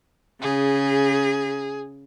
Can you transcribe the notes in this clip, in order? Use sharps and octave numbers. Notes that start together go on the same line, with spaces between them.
C#3 G#4